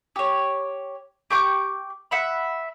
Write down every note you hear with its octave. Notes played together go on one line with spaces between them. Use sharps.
G4 C#5
G4 C#6 D6
E5 F#5 B5